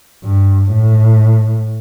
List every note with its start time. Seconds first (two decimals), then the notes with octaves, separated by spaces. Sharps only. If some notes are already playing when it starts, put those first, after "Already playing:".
0.24 G2
0.71 A2